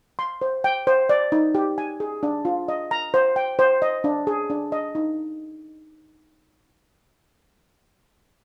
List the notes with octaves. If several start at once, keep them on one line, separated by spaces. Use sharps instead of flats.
C6
C5
G5
C5
D5
D#4
G4
G#5
G#4
D4
F4
D#5
A#5
C5
G5
C5
D#5
D4
G#4
D4
D#5
D#4